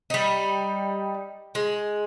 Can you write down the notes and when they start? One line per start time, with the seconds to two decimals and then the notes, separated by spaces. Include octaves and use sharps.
0.10 G3 D#4
1.55 G#3